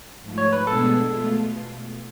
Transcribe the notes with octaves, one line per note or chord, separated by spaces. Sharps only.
G#2 F3 A3
C#5
B4
B2 G#3 B3 D4 G#4 A4
B2 A3 F4